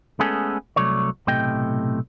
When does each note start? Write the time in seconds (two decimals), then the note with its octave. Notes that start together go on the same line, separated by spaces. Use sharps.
0.19 G#3 A3 B3 C#4 G#4 A4
0.76 C2 F#2 F#3 A3 C#5 D5
1.27 B1 A2 C3 A3 D#5 G5